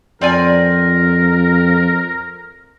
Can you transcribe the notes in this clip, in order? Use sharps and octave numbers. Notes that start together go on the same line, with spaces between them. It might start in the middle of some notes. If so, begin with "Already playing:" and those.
F2 C4 A#4 D5 G#5